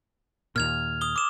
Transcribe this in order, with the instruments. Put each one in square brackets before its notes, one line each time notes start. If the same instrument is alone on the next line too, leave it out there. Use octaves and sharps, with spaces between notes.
[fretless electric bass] D#2 A#2 [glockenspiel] F6 G#6 F7
[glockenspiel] D#6 G7
D6 E7